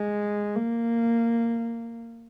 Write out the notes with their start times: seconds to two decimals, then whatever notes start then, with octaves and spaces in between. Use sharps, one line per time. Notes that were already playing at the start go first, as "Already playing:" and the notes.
Already playing: G#3
0.56 A#3